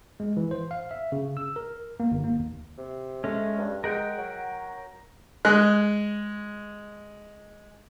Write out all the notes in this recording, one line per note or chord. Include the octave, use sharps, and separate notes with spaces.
G#3
E3
C5
F5
E5
C#3
E6
A#4
A#3
G1
A#3
D#2
C3
G#3 A3 C#4
G2
G#3 A#4 F#5 G5
F#3
G#3 F#6